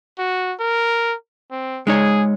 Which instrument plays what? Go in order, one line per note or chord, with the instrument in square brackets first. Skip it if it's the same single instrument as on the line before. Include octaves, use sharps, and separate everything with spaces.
[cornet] F#4
A#4
C4
[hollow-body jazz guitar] G#3 D#4 C#5 [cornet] G#4